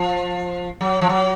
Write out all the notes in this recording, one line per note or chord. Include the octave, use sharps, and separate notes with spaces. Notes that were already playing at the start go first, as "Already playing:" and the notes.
Already playing: F3
F#3
F3
F#3